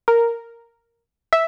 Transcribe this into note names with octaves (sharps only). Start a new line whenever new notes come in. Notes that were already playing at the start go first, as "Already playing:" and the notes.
A#4
E5